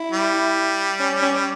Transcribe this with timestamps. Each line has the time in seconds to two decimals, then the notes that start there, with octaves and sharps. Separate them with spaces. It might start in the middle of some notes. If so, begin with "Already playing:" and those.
Already playing: E4
0.12 G3
0.99 C#4
1.22 C#4